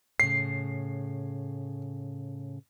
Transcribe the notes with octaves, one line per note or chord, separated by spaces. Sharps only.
A2 C#3 C7